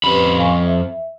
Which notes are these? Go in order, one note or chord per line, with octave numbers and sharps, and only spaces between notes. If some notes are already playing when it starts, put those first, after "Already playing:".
F2 C#4 G4 B4 B5
F5 G#5 C#6
E5